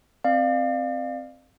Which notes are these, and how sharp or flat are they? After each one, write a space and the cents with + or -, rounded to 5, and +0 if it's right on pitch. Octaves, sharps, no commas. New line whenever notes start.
C4 +0 D5 +40 F5 +0